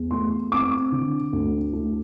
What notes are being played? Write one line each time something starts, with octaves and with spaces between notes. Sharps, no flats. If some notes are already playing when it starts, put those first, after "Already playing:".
Already playing: E2
A3 C6
C4 D6
D3
D2
A3